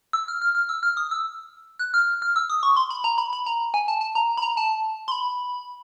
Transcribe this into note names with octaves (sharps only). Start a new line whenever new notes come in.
E6
F6
F6
F6
E6
F6
D#6
E6
F#6
F6
F6
E6
D#6
C#6
C6
B5
A#5
B5
B5
A#5
G#5
A5
A5
A#5
B5
A#5
A5
C6
B5